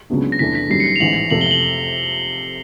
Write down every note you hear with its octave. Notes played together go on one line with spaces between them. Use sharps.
C#2 C#3 F#3 B3 D4
A#6
E2 C3 E3 A3 D4 B6
B6
F#2 D#3 G3 C7
C#7
F7
A1 G#2 E3 F#7
F2 C3 F3 A3 F#7
G7
F#7